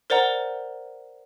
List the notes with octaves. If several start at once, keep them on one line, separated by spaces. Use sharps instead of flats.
A#4 C5 D5 F#5 A#5